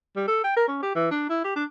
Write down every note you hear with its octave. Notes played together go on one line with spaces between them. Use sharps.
G3
A4
G5
A#4
C#4
G4
E3
D4
E4
G4
D4